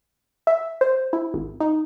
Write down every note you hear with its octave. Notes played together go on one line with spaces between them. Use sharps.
E5
C5
E4
G#1
D#4